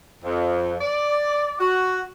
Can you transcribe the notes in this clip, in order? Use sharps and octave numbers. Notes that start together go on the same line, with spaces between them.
F2
D5
F#4